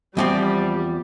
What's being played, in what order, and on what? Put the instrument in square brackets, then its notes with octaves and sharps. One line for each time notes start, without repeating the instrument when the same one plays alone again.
[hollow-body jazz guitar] E2 F3 C4 [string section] G3